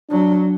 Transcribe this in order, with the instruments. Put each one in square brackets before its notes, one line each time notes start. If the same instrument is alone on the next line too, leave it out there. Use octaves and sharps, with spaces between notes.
[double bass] F#3 [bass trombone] D4